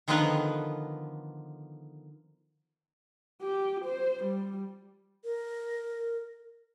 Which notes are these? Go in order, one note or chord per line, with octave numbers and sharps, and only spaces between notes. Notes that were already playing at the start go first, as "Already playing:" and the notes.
D3 D#3 F3 B3 D#4 B4
G4
C5
G3
A#4